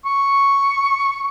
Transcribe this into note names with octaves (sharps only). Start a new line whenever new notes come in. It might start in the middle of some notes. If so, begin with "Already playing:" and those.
C#6